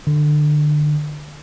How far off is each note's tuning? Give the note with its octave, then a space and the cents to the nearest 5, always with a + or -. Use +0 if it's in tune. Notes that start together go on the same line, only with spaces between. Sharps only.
D3 +25